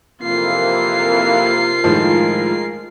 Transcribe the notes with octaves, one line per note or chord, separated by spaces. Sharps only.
F2 C3 E3 A#3 F4 C7
A2 D#3 F3 G#3 G#4 A#4